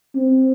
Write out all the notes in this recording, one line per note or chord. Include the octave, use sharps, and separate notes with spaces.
C4